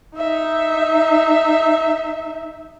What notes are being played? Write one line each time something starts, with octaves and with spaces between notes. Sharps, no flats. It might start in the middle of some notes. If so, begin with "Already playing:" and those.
D#4 E5